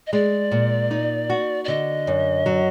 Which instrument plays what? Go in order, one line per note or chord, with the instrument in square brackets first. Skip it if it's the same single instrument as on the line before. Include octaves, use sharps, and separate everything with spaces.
[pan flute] D#5
[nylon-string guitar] G#3 [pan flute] D5
[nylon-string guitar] A#2
D#4
F#4
[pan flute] D5
[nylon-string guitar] D3 [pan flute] D#5
[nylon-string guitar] F#2
F#3